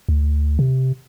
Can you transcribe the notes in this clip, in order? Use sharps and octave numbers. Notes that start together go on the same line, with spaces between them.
D2
C3